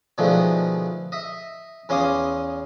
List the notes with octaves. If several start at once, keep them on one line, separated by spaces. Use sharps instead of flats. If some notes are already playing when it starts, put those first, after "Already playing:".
B2 D3 D#3 F3 G#3 A3
D#5 E5
E2 C#4 F4 C6 D6 D#6